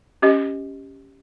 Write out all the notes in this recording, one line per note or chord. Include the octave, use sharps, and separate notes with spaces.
C#4 G4 D#5